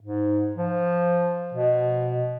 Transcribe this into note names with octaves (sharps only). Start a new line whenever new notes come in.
G#2
F3
B2